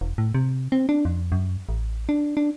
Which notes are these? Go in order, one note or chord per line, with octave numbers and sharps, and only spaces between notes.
E1
A2
C3
C4
D4
F2
F#2
A1
D4
D4